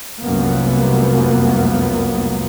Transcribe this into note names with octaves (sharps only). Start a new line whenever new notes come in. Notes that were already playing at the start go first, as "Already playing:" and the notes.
F1 C2 F#2 C3 A#3 B3